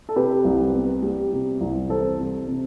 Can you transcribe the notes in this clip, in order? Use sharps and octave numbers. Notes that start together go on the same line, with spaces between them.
A4
C3 G4 B4
C2
B3
G3
C3
C2
E3 A4 C5
C3
C3